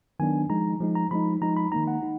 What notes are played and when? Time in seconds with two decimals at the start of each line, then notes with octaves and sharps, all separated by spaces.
0.20 D#3 F#3 B3 D4 G#5
0.49 F3 G#3 D#4 A#5
0.81 F3 G#3 D#4
0.95 A#5
1.11 F3 G#3 D#4 B5
1.42 F3 G#3 D#4 A#5
1.57 B5
1.72 D#3 A#3 D#4 A#5
1.88 F#5
2.03 D#4